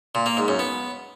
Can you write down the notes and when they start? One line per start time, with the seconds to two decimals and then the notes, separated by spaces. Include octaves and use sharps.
0.15 A#2
0.26 A#3
0.37 G#2
0.48 F#2
0.59 B3